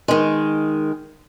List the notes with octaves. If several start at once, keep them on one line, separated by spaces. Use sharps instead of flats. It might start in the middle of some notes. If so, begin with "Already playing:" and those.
D#3 G#3